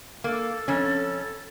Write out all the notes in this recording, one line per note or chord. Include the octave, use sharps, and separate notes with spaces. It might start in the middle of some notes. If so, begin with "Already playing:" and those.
A#3 A4
F2 C#4